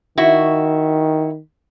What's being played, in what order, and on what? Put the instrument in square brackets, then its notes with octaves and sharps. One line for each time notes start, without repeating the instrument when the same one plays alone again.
[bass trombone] D#3 [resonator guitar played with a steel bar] E4 F#4